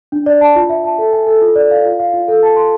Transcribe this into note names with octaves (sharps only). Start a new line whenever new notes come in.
D4
D5
A5
F4
E5
A5
A4
G#5
A4
F4
D5
F5
F4
F5
F4
A4
A5
C6